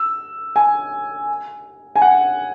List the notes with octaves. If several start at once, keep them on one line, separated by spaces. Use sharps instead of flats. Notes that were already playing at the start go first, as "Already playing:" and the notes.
Already playing: E6
G#5
G#5
F#5